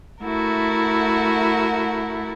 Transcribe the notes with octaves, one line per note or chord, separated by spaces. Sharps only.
A3 E4 F#4 A#4